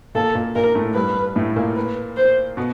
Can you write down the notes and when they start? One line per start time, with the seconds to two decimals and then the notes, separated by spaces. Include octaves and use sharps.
0.15 A#2 A#3 A4
0.35 A#2 A#3
0.55 A#2 A#3 A#4
0.75 A2 A3
0.95 G2 G3 B4
1.36 A2 A3
1.56 A#2 A#3
1.76 B4
2.16 C5
2.57 B2 B3